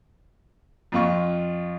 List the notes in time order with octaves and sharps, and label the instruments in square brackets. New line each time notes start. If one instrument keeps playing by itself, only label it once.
[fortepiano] F2 F4 C#6